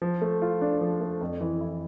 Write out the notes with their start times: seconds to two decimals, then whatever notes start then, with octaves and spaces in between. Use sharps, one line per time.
0.02 F3
0.22 A3
0.42 F4
0.61 D4
0.81 F3
1.01 A3
1.21 F2
1.41 E3
1.61 E4